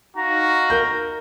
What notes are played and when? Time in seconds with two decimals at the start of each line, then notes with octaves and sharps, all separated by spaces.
0.17 D#4 F#4 F5 A#5
0.70 A#4 G6